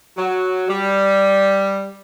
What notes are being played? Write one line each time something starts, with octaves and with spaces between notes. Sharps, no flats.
F#3
G3